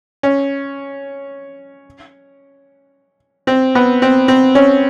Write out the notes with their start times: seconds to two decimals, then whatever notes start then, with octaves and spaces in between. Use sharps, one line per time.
0.23 C#4
3.47 C4
3.75 B3
4.02 C4
4.28 C4
4.55 C#4